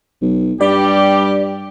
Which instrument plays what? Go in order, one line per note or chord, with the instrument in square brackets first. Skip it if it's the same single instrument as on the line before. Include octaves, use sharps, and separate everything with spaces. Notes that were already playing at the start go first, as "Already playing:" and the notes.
[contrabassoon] B1
[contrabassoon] G2 [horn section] G3 G4 [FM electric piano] D5